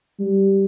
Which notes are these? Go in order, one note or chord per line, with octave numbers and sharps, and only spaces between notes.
G3